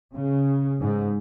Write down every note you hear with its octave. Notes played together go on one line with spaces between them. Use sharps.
C#3
G#2